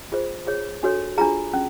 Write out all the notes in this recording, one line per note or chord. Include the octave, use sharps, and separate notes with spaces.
F4 G#4 C5
F4 G#4 C#5
D4 F#4 A4 C#5
D4 F4 G#4 A#5
C#4